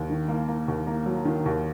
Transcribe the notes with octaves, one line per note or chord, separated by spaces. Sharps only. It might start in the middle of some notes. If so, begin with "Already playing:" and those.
Already playing: D#2
D#3
A#3
A#3
D#2
A#3
F#3
D#3
D#2